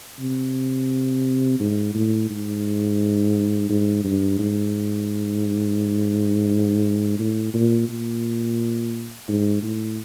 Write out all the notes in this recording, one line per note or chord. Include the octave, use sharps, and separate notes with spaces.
C3
G#2
A2
G#2
G#2
G2
G#2
A2
A#2
A#2
G#2
A2